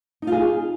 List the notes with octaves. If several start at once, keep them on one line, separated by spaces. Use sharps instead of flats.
D#4 F4 G#4